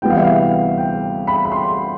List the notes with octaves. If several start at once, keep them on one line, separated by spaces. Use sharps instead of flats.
D2 C3 E3 G3 B3 G5
F5
E5
F5
G5
B5
B5
C6